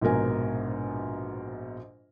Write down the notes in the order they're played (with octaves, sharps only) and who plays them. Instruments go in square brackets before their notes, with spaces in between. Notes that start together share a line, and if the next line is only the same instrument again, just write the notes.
[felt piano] A#1 G#2 B2 A#4 G#5